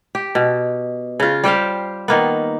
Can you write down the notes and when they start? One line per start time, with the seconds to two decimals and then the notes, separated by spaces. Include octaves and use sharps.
0.15 G4
0.35 B2
1.20 C#3 F4
1.44 G3 G4 C5 F5
2.08 D#3 A#3 B3